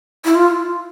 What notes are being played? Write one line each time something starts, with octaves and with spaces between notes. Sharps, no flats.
E4
F4